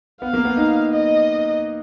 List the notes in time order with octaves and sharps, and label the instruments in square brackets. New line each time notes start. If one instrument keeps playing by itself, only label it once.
[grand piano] B3 [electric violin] F5
[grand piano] A#3
B3
D#4
[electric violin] D#5